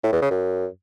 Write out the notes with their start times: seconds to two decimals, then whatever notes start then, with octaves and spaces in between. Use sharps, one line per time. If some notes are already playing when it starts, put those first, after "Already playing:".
0.04 A2
0.13 E2
0.22 C#3
0.31 F#2